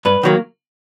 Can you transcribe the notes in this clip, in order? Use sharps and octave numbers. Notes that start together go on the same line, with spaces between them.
G2 B4
D#3 F#3 A#3